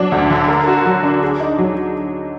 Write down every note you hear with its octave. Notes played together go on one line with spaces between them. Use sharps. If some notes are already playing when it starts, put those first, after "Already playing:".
Already playing: F#3 D4
D2
D3
A#4
F#4
F#3
D4
G#4
D#4
F#3